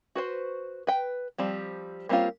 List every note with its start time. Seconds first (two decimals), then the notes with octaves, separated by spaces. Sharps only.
0.15 F#4 B4 C5
0.87 B4 G5
1.38 F3 G3 C4
2.09 G3 A#3 C4 C#4 F4